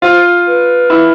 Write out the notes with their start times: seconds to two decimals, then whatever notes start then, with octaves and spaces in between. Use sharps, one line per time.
0.02 F4 C5
0.46 B4
0.90 E4